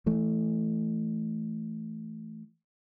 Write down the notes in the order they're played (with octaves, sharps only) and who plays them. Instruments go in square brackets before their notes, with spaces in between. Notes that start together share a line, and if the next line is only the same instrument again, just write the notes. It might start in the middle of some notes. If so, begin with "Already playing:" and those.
[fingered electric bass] E3 A3